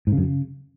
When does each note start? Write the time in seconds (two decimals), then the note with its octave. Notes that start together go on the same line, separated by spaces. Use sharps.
0.07 G#2
0.12 C#3
0.18 F#2
0.23 C#3